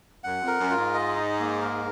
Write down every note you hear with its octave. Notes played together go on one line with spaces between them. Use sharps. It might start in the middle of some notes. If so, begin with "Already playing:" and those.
F#2 F#5
F2
A#4
F#2
F4
G#2
D#5
D#4
A#3
A#4